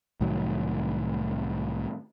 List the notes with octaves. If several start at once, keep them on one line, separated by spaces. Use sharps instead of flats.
C2 A2 D#3 F#3